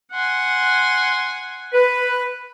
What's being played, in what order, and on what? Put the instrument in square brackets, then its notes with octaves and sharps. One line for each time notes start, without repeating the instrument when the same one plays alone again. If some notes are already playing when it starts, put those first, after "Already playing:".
[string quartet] F#5 G#5 C6
[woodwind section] B4